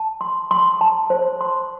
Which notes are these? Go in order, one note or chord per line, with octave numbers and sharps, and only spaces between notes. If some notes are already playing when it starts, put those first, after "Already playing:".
Already playing: A5
C6
C6
A5
C5
C6